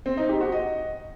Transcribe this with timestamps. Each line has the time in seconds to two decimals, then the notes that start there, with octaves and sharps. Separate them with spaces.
0.06 C4
0.17 D#4
0.29 G4
0.41 F#4
0.52 D#5